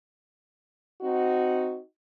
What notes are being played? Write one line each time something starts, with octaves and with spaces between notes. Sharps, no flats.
C4 D#4 F#4